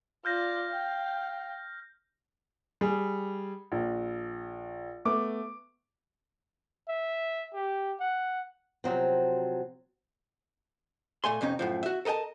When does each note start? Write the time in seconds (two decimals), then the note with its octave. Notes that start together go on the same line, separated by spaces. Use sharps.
0.25 F4 D5 F6 G6 A#6
0.70 F5 G5
2.81 G3 G#4
3.72 A#1
5.05 A3 B3 D6
6.88 E5
7.54 G4
8.00 F#5
8.84 C3 F3 F#3 C4
11.24 A#2 A3 G#5 C6
11.41 F2 C3 C#4 D#4
11.59 F#2 A2 F3
11.83 F#4 E5
12.05 A4 A#4 D#5 G5 A5